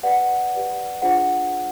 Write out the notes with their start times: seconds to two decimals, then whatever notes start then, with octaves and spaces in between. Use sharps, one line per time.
0.03 G4 B4 D5 F#5
0.53 G4 B4 D5
1.02 D4 F4 G#4 C5 F#5